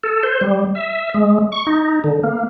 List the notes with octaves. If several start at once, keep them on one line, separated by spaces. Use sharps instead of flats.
A4
C5
G3
E5
G#3
C#6
D#4
D3
A#3